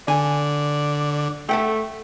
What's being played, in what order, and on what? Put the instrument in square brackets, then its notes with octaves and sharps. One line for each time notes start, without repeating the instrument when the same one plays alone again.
[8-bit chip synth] D3 [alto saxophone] D5 [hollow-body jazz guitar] G#5
[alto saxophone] A3 [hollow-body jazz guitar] A4 F#5 G5